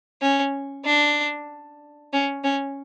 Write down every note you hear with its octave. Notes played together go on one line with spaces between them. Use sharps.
C#4
D4
C#4
C#4